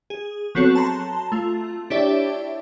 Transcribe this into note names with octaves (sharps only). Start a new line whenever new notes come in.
G#4
F#3 B3 C4 F#4 A4 C#5
A5 A#5 C6
A3 F4
D4 E4 G4 C#5 D5 E5